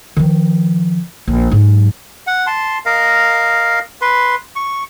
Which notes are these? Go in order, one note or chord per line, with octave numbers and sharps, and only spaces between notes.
D#3 F3
A#1
G#2 F#3
F#5
A5 C6
A#4 D#5 F5
B4 C6
C#6